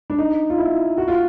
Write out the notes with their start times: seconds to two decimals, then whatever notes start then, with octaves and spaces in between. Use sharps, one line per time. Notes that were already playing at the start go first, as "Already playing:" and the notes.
0.10 D4
0.18 D#4
0.50 F4
0.58 E4
0.98 F#4
1.08 F4